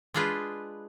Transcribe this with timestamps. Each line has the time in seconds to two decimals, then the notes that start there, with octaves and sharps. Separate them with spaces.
0.14 G#3 D4 F4 G#4 B4